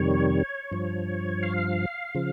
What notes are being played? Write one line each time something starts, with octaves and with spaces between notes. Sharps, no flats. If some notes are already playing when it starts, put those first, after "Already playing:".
Already playing: F2 C3 D#3 G3 C#5
G2 F3
F5
C#3 F3